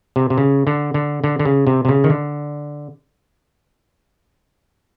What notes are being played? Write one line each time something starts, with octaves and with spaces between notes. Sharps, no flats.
C3
C3
C#3
D3
D3
D3
D3
C#3
C3
C3
C#3
D#3
D3